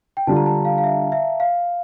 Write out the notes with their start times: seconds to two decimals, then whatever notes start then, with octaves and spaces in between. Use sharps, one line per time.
0.17 G5
0.27 D3 G3 D4 F4 A5
0.36 A#5
0.46 A5
0.65 F5
0.78 F5
0.84 E5
1.12 E5
1.40 F5